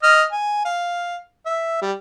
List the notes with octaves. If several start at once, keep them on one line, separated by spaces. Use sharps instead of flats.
D#5 F6
G#5
F5
E5
G3